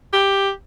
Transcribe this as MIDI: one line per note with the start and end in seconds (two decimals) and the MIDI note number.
0.13 0.50 67